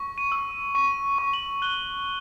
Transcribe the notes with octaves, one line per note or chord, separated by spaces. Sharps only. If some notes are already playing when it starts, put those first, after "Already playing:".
Already playing: C#6
D#7
E6
C#6 D#7
C#6
F#7
F#6 G7